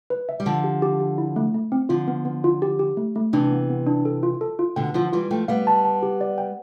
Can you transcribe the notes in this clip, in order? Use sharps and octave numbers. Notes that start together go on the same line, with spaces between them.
B4
E5
G3
D3 F3 A5
G4
G4
G4
E4
A3
A3
C4
D3 F3 F4
B3
B3
F4
G4
G4
A3
A3
C3 E3 D4
B3
B3
D4
A4
F4
A4
F4
B2 D3 G5
D3 F3 F4
E3 G3 F4
F3 A3 G5
G3 B3 F5
A5
A5
G4
D5
G5